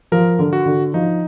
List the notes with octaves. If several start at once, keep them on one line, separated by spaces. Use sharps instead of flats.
F3 A#4
D3
F#4
D3
F3 D#4